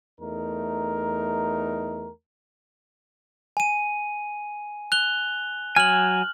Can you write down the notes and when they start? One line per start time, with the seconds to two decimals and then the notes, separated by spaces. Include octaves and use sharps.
0.21 E2 A3 D#4 A#4
3.57 G#5 D#7
4.92 F#6 F7 G7
5.76 F#3 G#5 F6 F#7